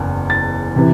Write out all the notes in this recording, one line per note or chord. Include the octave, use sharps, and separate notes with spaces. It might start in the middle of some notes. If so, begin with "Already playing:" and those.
Already playing: F#1 E2 E3
A6
C3 E3